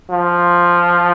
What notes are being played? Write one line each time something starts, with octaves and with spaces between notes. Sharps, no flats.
F3